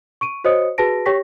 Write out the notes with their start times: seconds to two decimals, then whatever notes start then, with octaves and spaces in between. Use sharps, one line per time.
0.21 C#6 D7 D#7
0.44 F#4 C5 C#5 D#5 D#6 C#7
0.78 F#4 G#4 B4 A5 A#6 D7
1.06 G4 C#5 G5 C#6 A#6 B6